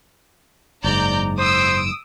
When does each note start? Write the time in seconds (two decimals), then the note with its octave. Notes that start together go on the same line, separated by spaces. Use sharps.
0.84 F#1 G#2 D5 A#5 G6
1.39 C5 D#6 E6 D7